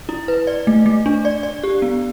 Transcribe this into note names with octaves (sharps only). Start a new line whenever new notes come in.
E4
B4
D5
A3
A3
D4
D5
D5
G4
B3